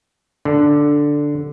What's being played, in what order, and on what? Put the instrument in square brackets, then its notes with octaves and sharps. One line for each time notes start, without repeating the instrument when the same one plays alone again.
[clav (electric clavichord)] D3